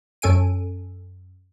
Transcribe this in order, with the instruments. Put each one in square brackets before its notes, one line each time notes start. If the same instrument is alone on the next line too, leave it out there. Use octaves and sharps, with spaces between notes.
[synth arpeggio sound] F#2 C#4 A4 G#5 D7 D#7